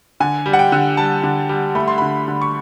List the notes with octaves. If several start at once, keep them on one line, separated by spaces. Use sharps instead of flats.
D3 G#5
G3
F#5
G5
D3
G3 A5
D3
G3
A3 B5
C6
D3 B5
D3
C#6